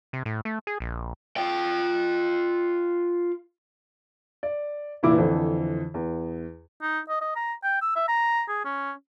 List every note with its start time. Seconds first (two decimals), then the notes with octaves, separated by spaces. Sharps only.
0.13 C3
0.25 A2
0.45 A3
0.67 G#4
0.80 A#1
1.37 F4 G5
4.43 D5
5.03 F1 A#2 E3 E4 D6
5.17 F2 D3 E3 C5
5.94 E2
6.81 D#4
7.09 D#5
7.21 D#5
7.36 A#5
7.64 G5
7.82 E6
7.96 E5
8.08 A#5
8.48 G#4
8.65 C#4